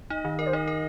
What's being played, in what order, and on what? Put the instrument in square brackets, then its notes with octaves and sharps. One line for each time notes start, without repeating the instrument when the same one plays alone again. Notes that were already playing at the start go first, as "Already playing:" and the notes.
[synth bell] D#4 [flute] D#5
[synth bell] D#3
[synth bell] A#4 [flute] D#5
[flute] C5
[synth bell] D#4 [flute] D#5
[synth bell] A#4